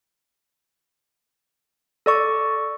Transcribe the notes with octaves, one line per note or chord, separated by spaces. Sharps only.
A4 D5 C#6